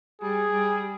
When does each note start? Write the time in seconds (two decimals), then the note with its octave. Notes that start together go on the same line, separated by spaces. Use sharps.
0.22 G3 G#4
0.51 G3